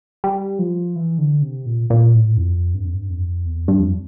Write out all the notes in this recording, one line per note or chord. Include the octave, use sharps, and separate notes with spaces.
G3
F3
E3
D3
C3
A#2
A#2
A2
F2
G2
F2
G2
F2
E2
G2
F2